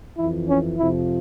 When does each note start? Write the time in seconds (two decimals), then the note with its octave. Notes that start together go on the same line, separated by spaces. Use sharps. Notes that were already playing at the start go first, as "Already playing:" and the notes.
0.18 F2 E3 E4
0.49 C#4
0.79 F2 C3 F3 E4